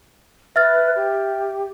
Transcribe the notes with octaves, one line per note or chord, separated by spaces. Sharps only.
B4 E5 F6 A6
G4